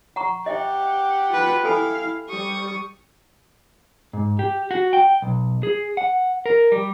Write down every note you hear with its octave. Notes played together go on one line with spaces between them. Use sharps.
F#5 A#5 C#6
G4 D#5 E5 F#5 G5
F4 B4
E4 A4 F5 G#5 B5
G3 C#6 D#6
G#2
G4
F#4
G5
B1
G#4
F#5
A#4
G3